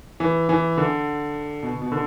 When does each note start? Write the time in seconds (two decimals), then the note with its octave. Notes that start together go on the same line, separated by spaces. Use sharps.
0.20 E3
0.49 E3
0.77 D3
1.63 B2
1.82 B2
1.92 D3